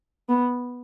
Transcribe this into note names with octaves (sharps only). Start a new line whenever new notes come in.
B3